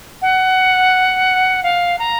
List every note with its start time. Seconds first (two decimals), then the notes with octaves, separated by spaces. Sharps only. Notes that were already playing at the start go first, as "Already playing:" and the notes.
0.22 F#5
1.63 F5
1.99 A#5